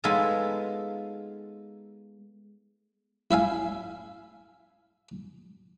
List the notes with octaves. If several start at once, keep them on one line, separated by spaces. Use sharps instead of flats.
G#3 B3 D#4 F4 A4 G#5
E4 E5 F5 G#5